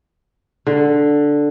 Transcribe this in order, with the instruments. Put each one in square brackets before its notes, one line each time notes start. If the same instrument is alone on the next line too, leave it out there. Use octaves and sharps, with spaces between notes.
[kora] D3